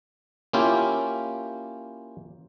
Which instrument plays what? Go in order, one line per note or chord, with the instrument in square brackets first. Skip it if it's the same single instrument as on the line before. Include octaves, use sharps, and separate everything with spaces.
[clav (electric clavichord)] A#3 C#4 E4 F4 G4